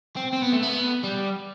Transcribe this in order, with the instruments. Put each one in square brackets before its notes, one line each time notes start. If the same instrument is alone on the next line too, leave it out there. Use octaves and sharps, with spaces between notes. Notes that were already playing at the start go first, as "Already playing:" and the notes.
[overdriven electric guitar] C4
C4
B3
A3
B3
G3